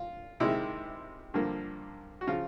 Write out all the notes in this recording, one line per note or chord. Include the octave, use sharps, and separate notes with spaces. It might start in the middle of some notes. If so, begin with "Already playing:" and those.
Already playing: F4
C3 D#3 G#3 E4
G2 D3 F3 A#3
F#4
C#3 F3 F4